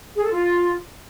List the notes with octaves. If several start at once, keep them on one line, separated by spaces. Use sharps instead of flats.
G#4
A4
F4